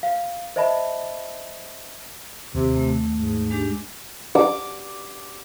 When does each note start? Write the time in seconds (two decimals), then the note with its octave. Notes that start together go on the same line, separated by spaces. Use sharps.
0.03 F5
0.56 C5 D#5 E5 A5 B5
2.55 D#2 C3
2.76 A3
3.18 G#2
3.50 G#3 D4 G4
4.35 D6